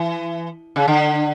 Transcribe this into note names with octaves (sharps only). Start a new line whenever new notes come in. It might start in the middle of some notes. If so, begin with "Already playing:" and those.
Already playing: E3
C#3
D3